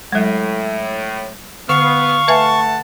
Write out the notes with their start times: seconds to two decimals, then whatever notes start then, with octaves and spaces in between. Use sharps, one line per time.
0.12 A2 F#3 G#3
1.69 D3 B3 F5 C#6
2.28 A3 B4 E5 F#5 G#5 A5